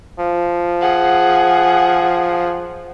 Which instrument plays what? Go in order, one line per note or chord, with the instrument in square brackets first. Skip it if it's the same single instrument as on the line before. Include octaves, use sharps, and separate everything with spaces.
[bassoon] F3
[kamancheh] G#4 F#5